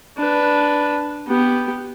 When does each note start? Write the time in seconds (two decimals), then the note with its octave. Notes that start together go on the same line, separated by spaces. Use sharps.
0.17 D4 B4
1.27 B3 G4